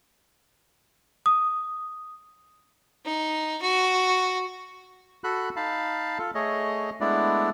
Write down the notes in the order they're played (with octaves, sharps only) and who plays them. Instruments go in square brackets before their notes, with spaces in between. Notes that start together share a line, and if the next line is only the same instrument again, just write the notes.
[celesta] D#6
[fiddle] D#4
F#4
[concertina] F#4 A4 B5 F#6
D#4 F5 A5 B5
F4 A4
A3 G#4 C#5 D#5
G#3 A3 B3 D4 E4 D5